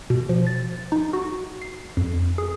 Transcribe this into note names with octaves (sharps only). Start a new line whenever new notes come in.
B2
F3
A6
D#4
F#4
C7
F2
G#4